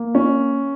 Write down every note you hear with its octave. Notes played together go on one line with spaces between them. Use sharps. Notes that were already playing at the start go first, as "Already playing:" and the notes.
Already playing: A#3
C#4